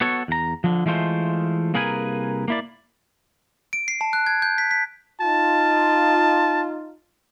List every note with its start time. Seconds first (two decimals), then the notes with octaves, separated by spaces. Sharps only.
0.01 B3 F#4 A4 C#5
0.28 E2 A#5
0.64 D3 F3
0.86 E3 G#3 A3 F4 C5
1.74 C2 A#3 G#4 A#4 B4 G#5
2.48 A#3 E4 D5
3.73 D7
3.88 C7
4.01 A5
4.13 F#6
4.26 G#6
4.42 G6
4.58 B6
4.71 B6
5.21 D#4 F4 A5